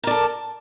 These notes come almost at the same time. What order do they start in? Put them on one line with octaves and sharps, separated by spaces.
A#4 D5 A4